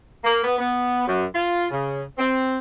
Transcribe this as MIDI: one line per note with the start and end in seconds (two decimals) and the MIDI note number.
0.24 0.41 58
0.44 0.57 59
0.58 1.06 59
1.06 1.24 42
1.35 1.66 65
1.71 2.03 49
2.19 2.57 60